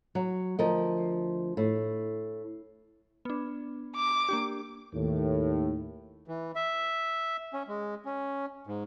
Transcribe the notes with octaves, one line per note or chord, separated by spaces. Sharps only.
F#3
D2 F3 A#4 D#5
A2
B3 D4
D6
A#3 D4 G4
D#2 A2
E3
E5
C#4
G#3
C#4
G#2